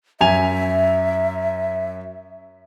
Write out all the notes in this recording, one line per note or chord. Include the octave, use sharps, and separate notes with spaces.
F#2 E5 G#5 F7